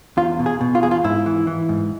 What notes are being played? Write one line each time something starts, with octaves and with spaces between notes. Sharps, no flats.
E2 F4
B2
G#4
B2
F4
E2 G#4
F4
G#2 E4
E3
E3
G#2